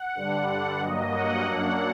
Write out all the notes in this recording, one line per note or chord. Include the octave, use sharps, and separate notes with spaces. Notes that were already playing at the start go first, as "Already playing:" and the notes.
Already playing: F#5
G2 D3 G3 D4
F#5
G2 F#3 A#3 D#5
F#5
F#2 F#3 A#3 D4 F#5